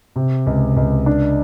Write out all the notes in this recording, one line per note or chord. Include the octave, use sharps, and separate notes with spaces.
C3
C#2
C#2
D4